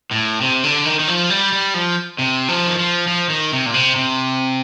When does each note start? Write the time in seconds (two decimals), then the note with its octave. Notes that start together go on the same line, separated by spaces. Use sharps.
0.11 A2
0.41 C3
0.64 D3
0.85 D#3
0.99 D#3
1.08 F3
1.30 G3
1.52 G3
1.74 F3
2.18 C3
2.48 F3
2.67 D#3
2.78 F3
3.08 F3
3.30 D#3
3.52 C3
3.66 A#2
3.74 C3
3.96 C3